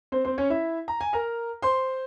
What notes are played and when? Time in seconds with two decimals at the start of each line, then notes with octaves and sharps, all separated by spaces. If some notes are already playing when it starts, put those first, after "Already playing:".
0.12 C4 C5
0.25 C4 C5
0.38 C#4 C#5
0.50 E4 E5
0.88 A#5
1.01 G#5
1.13 A#4 A#5
1.62 C5 C6